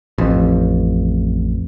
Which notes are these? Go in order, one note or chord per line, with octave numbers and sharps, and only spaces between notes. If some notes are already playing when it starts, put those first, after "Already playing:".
A1 F2